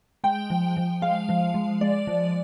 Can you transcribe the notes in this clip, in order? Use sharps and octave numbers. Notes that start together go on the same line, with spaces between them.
G#3 G5
F3
F3
G#3 F5
F3
G#3
G#3 D5
F3